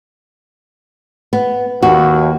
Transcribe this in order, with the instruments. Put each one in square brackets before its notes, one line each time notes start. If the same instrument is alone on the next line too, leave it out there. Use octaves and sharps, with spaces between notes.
[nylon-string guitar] B3
[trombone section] D#2 [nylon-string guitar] F#4